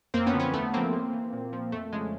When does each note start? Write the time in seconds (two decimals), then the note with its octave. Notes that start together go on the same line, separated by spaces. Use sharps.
0.14 F#2 A#3 C4
0.26 B3 C#4
0.33 D3 F3
0.40 B3 C#4
0.53 E2 A3 B3
0.74 C#3 F3 A#3 C4
0.93 A2
1.13 E3
1.33 A#2
1.53 F3
1.72 F2 A3
1.93 C#3 F3 G#3